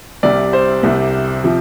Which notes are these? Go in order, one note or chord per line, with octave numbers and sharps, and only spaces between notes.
C2 C3 G3 D5
C5
C2 C3 G3
C3 F3